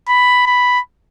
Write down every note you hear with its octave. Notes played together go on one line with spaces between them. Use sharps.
B5
B5